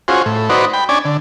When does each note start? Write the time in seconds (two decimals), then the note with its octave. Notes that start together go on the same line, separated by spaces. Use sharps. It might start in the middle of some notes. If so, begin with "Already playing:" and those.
0.08 C#4 F4 F#4 G#4 C5
0.26 A2
0.50 D#4 F#4 B4 C5 D5
0.73 G5 B5
0.89 C#4 D4 D5 G#5
1.05 D3